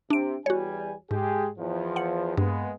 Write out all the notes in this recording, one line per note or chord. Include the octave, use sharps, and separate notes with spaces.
C3 D4 D7
E2 G3 F#4 C#5 G#5
G#2 G#3 G4 G#4
E2 F3
F#5 C#7
G2 G#3 A#3 B3